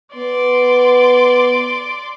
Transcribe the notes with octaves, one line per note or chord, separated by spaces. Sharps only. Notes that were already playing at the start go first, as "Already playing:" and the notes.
B3 D5 C6 D6